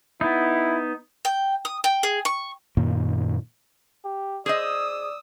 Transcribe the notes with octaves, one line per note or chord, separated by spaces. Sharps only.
B3 D#4 E4
G5
D#6
G5
G#4
C#6
F#2 A#2 D#3 A#3
G4
G#4 C5 D5 D#5 D#6 E6